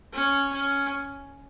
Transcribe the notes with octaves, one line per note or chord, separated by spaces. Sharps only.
C#4
C#4